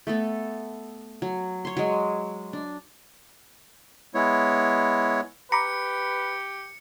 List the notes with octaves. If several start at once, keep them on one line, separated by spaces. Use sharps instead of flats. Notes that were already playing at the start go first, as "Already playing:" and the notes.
A3 B3 A4
F#3
C#5 C6
F#3 G#3
D4
G#3 B3 E4 C#5
G4 B4 A#5 B5 D6 C#7